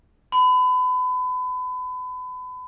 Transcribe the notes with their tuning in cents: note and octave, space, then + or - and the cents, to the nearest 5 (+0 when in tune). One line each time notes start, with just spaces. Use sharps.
B5 +30